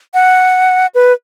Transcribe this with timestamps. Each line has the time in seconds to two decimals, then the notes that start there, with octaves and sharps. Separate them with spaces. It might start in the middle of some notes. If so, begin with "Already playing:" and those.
0.14 F#5
0.95 B4